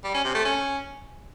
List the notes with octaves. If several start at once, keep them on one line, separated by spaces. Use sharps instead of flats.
G3
C#4
C3
A3
C#4